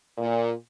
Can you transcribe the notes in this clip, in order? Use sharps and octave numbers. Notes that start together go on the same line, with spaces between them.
A#2